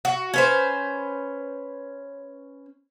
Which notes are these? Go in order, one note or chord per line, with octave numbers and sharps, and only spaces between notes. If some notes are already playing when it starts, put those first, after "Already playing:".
F#4
C#4 B4 C5